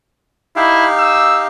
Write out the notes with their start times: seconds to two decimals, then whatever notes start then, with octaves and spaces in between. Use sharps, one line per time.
0.56 D#4 E4 G4 F5
0.99 E6